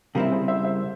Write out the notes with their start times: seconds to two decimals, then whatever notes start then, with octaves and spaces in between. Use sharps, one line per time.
0.15 C#3 G3 C4 E4 G4 A#4
0.32 G#4 C5
0.48 C5 E5
0.64 C5 E5